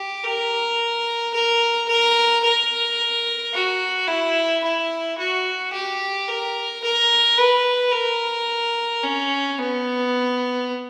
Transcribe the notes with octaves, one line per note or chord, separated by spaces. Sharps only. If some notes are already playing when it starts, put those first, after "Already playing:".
Already playing: G4
A#4
A#4
A#4
A#4
F#4
E4
E4
F#4
G4
A#4
A#4
B4
A#4
C#4
B3